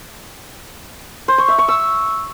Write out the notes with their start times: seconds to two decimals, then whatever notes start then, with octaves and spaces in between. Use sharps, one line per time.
1.28 C5
1.38 C#6
1.48 E5
1.58 C#6
1.68 E6